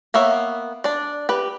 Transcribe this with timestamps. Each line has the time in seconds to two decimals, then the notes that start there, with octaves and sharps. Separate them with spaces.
0.14 A#3 B3 C#5 E5
0.84 D4 D5
1.29 G4 B4